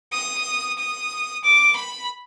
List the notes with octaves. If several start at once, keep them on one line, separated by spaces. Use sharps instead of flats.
D#6
D#6
D6
B5